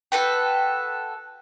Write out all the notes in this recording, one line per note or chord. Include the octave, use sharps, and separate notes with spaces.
F#4 A4 B4 G5